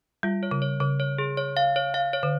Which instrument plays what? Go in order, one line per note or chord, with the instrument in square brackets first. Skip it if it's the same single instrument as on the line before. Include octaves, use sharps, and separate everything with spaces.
[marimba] G3 [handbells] F4
[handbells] C#5
[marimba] C#3
[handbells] C#5
[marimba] C#3 [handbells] C#5
[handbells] C#5
G#4
C#5
F5
C#5
F5
C#5
[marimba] D3